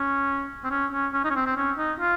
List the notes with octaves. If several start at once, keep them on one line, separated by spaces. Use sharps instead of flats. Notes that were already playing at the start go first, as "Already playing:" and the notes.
Already playing: C#4
C4
C#4
C#4
C#4
D#4
C#4
C4
C4
C#4
D#4
F4